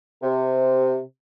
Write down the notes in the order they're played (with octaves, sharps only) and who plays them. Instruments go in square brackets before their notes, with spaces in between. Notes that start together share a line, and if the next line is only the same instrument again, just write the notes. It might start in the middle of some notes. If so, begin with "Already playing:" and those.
[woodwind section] C3